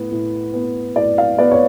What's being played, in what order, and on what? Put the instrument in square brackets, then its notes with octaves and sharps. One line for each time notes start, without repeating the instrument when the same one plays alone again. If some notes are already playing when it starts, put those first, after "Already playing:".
Already playing: [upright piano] A2 B3
A2
B3
A2 D5
F5
B3 D5
C#5